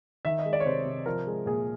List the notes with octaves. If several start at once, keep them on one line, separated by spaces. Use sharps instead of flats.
D#3 E5
D#5
G#3
D5
C#5
C3 C5
C3
F3 A#4
G#3
A#2 G#4